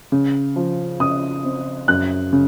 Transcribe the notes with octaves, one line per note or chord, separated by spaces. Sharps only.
C#3
F3
C#3 D#6
C4
F#2 F#6
C#3